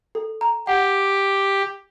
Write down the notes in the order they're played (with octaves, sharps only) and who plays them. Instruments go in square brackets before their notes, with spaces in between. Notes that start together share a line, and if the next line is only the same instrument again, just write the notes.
[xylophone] A4
A#5
[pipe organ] G4 [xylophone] F#5